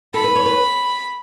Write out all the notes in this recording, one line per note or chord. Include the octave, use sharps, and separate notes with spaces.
A4 B5
B4
C#5
B4